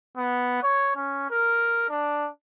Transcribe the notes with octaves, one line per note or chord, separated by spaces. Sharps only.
B3
C#5
C#4
A#4
D4